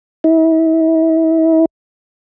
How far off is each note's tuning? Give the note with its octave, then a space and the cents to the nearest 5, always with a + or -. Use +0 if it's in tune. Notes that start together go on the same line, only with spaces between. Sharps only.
E4 -35